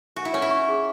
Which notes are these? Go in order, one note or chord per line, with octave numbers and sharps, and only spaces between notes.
F#4 G#5
E4
C#4 C#5
E4
C#6
G#4